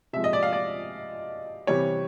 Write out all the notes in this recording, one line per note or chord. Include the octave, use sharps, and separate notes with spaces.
C3 F3 G#3 E5
D#5
D5
F5
D5
C3 E3 G3 C#5